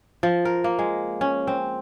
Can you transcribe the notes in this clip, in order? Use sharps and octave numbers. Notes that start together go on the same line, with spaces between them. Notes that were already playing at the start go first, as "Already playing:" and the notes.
F3
A#4
A#3
G#3
C#4
C4